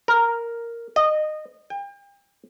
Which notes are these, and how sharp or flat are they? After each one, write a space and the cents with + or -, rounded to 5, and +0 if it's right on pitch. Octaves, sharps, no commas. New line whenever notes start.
A#4 +0
D#5 -20
G5 +40